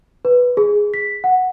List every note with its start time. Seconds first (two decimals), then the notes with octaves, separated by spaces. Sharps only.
0.25 B4
0.57 G#4
0.94 B6
1.24 F#5